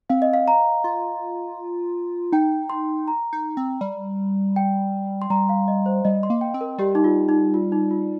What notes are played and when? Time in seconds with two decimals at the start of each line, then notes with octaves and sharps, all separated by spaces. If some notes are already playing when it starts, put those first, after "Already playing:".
0.10 C4 F5
0.22 D#5
0.34 F5
0.48 A#5
0.84 F4
2.32 D#4 G5
2.70 C6
3.08 A#5
3.33 D#4
3.57 C4
3.81 G3
4.56 G5
5.22 C6
5.30 G3 A#5
5.49 F5
5.68 D#5
5.86 C5
6.05 G3 D#5
6.23 C6
6.30 A#3
6.41 G5
6.54 C4
6.61 A#4
6.78 G3 G4
6.95 D#4
7.04 F4
7.29 D#4
7.54 F4
7.72 D#4
7.91 F4